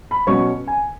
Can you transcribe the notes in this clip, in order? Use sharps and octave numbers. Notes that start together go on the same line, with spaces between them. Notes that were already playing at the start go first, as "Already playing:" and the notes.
B5
B2 F#3 C#4 C#6
G#5